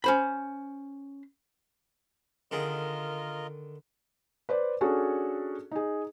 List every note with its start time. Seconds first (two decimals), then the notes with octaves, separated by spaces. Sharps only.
0.04 C#4 C5 B5
2.51 D3 D#3 F4 G#4 A#4 D#5
4.49 B4 C5 D5
4.81 C#4 D4 F#4 G#4 A4
5.71 D#4 G#4